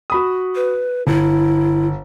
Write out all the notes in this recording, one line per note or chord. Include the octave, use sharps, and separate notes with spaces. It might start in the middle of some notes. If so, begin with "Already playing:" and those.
F#4 B5 D#6
B4
G1 E4